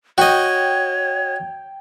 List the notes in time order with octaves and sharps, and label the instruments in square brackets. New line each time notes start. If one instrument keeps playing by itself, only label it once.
[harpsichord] F#4 D#5 [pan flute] C#5 [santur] G5